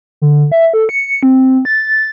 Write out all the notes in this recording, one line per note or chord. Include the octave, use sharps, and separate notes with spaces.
D3
E5
A4
C#7
C4
A6